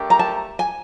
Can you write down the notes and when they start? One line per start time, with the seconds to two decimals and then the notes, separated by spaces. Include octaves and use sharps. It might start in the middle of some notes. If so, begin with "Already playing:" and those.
Already playing: A3 D4 G4 A#4
0.10 A#5
0.19 A5
0.59 G#5